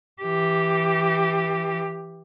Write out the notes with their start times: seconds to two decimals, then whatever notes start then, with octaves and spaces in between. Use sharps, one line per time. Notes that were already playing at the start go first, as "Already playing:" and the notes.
0.22 E3 G4